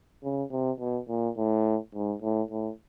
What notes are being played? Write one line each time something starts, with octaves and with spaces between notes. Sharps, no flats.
C#3
C3
B2
A#2
A2
G#2
A2
A2